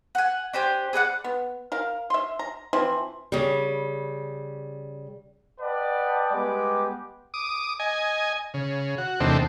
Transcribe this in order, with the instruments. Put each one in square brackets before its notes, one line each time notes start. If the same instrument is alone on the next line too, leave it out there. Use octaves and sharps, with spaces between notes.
[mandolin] F#5 G#5
D4 G4 C5 G#5
G#4 B4 D5 F#5
[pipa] B3
A#4 F5
E5 C6
A#5
E3 F3 C4 E4
[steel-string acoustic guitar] C#3 G3
[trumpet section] B4 D5 D#5 F#5 G5 A5
G3 G#3 B3 G4 B4 D6
[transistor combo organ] D6 D#6
D#5 G#5
C#3
F#4
E2 C3 D#3 A3 C4 D4